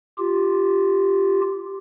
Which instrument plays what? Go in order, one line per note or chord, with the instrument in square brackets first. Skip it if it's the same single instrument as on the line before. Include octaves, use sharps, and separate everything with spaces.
[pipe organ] F4 G4